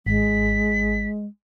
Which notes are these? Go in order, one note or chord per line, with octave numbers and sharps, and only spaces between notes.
G#1 G#3 B6